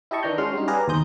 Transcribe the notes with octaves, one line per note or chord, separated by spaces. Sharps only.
E4 G4 D#5 A5 C#6
D#3 E3 D4 D#4 A#5 G6
G#3 C#4 D4 F#4 C6 F6
G3 C#4 D#4
G4 G#4 B4 D5 F5 A#5
D#2 B2 C5 D#6 G6